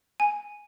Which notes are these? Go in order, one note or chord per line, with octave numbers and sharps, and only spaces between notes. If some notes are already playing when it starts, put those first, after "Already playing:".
G#5